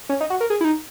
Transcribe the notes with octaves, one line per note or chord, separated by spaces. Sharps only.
C#4
D#4
F#4
A#4
G#4
E4
D#4